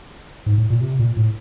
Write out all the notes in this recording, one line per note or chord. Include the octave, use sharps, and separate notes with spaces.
G#2
A2
A#2
C3
A#2
A2